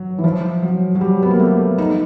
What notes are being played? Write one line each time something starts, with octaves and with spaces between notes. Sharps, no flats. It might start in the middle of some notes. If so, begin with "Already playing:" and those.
Already playing: F#3
E3
F3
F#3
F#3
G3
B3
A#3
A3
D#4